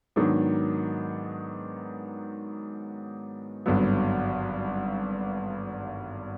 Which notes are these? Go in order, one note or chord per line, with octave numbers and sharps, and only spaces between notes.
G#2 D#3 F#3 B3 D4
G#1 G2 D3 F#3 B3